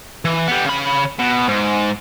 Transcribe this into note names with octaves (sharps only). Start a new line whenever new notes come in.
E3
G3 B3
C#3 B5
B2
G#2